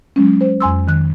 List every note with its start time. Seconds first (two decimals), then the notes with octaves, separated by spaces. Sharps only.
0.16 F#3 G#3 C#4
0.41 C5
0.60 F2 G#5 C6 E6
0.88 D#3 F#6